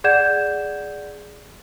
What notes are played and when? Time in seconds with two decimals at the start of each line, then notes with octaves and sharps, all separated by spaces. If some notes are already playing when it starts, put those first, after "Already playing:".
0.04 G#4 D5 F#5 G6 G#6 E7